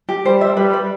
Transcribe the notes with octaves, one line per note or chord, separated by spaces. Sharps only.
G4
G3 C5
E5
G3 B4
B4